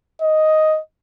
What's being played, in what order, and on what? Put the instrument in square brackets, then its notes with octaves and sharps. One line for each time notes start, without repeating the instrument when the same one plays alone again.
[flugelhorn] D#5